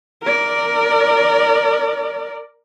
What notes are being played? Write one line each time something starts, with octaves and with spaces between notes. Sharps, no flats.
A#4 D5